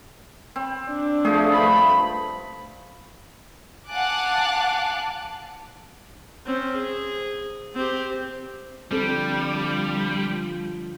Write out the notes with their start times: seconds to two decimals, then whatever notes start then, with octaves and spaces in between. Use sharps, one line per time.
0.56 C4
0.89 D4
1.25 F3 A3 G#4
1.55 G2 B5
3.89 F5 F#5 G#5 A5 D6 F#6
6.47 C4 C#4
6.76 G#4
7.75 C4 G4
8.91 D3 F3 G3 C4 A4